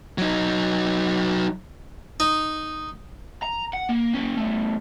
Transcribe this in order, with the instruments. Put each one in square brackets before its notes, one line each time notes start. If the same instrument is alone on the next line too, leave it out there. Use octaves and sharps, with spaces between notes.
[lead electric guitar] F#3 D#4
[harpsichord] D#4
[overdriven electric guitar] A#5
F#5
A#3
A#3 C#4
E2 A3